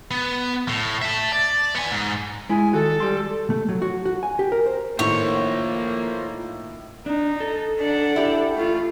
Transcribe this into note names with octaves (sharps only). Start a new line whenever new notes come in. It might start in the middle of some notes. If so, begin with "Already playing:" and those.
B3
A2
E5 A5
D5
B3 G#5
G#2
G#3 E4 G#5
D#3 F#4 A4
G3 C6
A3
F#3
F#4
F#4
G#5
G4
A#4
C5
A2 D#3 A#3 F4 A#4 C5 C#5
D4 D#4
A4
D4 F#5
E4 G4
A3 F4